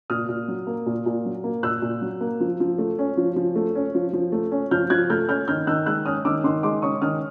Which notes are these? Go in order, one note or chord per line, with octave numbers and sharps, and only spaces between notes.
A#2 D#6 F6
A#2
F#3
A#3
A#2
A#2
F#3
A#3
A#2 E6 F#6
A#2
F#3
A#3
F3
F3
A3
C#4
F3
F3
A3
C#4
F3
F3
A3
C#4
F3 F6 G6
F3 F#6 G#6
A3 F6 G6
C#4 F6 G6
D#3 F6 G6
D#3 E6 F#6
G#3 E6 F#6
C#4 D#6 F6
D#3 D6 E6
D#3 C6 D6
G#3 C6 D6
C#4 C#6 D#6
D#3 D#6 F6